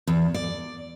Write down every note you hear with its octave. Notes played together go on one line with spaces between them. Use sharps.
E2
D5